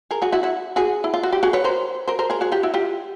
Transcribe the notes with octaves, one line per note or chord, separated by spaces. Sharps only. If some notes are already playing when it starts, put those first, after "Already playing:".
G#4 A#4
F#4 G#4
E4 F#4
E4 F#4
F#4 G#4
E4
F4
F#4
G4
F#4 G#4
B4 C#5
A#4 C5
A#4 C5
A#4 C5
G#4 A#4
F#4 G#4
F4 G4
E4 F#4
F4 G4